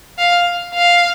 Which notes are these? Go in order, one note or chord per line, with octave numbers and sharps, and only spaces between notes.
F5
F5